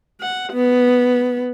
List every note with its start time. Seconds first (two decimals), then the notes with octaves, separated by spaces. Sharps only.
0.21 F#5
0.53 B3